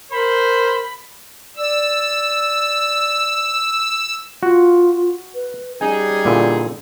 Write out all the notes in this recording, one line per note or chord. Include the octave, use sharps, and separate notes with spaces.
A#4 C5 B5
D5 E6
F4 F#4
B4
G3 C#4 D#4 G#4 G#5
A#2 D3 E4